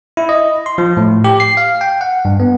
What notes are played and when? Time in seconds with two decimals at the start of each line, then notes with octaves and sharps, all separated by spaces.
0.17 E4
0.29 D#5
0.66 C6
0.78 F3
0.97 A2
1.24 G4
1.40 C7
1.57 F5
1.81 G5
2.01 F#5
2.25 G2
2.40 B3